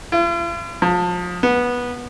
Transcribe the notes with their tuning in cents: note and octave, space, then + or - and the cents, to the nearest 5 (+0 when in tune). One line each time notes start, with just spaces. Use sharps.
F4 -45
F3 +30
B3 -15